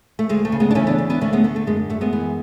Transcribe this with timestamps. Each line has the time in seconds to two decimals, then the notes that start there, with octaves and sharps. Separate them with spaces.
0.19 A3
0.29 D2 G#3
0.45 A3
0.52 C#3
0.60 G#3 B3
0.71 D4
0.75 E3 A3 C#4
0.87 B3 D4
0.98 D2
1.10 B3 D4
1.21 D3 A3 C#4
1.33 G#3 B3
1.44 D3 A3
1.56 A3
1.67 F#2 G#3
1.90 F#2 A3
2.01 G#3 B3
2.13 E3